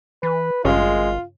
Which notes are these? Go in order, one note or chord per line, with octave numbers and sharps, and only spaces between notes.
E3 B4
G#1 G2 C#3 G#3 C#4 F4